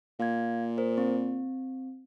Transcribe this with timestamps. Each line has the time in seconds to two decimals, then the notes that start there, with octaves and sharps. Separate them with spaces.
0.20 A#2 F5 G#6
0.78 A#4 C5
0.98 C4